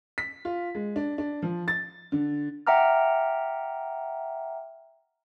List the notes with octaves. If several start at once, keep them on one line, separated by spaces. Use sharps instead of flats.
B6
F4
G#3
D4
D4
F3
A6
D3
E5 F#5 G5 A#5 D6 F6